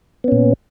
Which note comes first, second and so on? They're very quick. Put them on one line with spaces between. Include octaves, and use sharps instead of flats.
B3 C#4 A#2